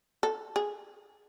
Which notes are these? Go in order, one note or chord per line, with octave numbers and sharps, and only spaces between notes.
A4
G#4